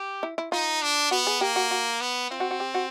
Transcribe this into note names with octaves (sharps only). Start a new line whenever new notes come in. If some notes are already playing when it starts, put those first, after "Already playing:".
Already playing: G4
E4
E4
D#4 F4
D4
B3 F#4
G#4
A#3 G4
F#4
F#4
B3
C4 F4
F#4
F#4
G4
F#4